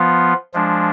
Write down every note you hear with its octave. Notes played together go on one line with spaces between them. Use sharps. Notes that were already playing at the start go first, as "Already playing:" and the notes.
Already playing: F3 B3 F4
F3 G#3 D4